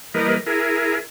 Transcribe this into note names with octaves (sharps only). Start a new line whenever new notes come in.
E3 G3 A#3 A#4 B4 D#5
E4 G#4 A#4